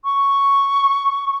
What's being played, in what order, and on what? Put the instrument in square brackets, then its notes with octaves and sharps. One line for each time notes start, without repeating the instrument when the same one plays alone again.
[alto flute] C#6